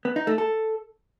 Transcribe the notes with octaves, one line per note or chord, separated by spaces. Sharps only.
B3
D#4
A3
A4